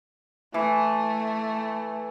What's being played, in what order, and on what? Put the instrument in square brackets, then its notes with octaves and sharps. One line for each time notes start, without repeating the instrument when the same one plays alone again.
[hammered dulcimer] E3 [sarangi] A3